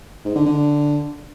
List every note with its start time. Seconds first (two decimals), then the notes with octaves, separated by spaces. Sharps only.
0.25 G#2
0.35 D3
0.46 D3